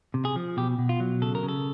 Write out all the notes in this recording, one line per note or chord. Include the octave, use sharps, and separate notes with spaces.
C3
G#4
F3
B2 G4
B2
F4
F#3
C#3 A4
A#4
C#3
A4